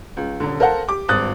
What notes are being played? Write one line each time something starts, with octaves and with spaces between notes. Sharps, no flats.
C#2
D#1 D3
A4 A#4 C5 F5 F#5 A5
G4 D6
G#1 G2 D#6 F#6 A6